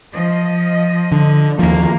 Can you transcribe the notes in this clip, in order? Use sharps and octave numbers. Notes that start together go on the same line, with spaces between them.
F3 D#5
D3
D#2 F3 A#3